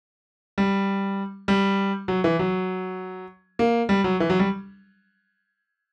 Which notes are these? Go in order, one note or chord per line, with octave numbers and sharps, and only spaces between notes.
G3
G3
F#3
E3
F#3
A#3
G3
F#3
E3
F#3
G3